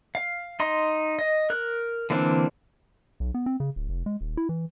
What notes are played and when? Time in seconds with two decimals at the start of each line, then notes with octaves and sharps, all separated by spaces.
0.15 F5
0.60 D#4 D#5 C6
1.19 D#5
1.50 A#4 F#6
2.10 D3 E3 A#3 C4 D4
3.20 B1
3.34 B3
3.46 C4
3.60 C#3
3.76 D1
3.89 F1
4.06 G#3
4.21 D#1
4.37 E4
4.49 E3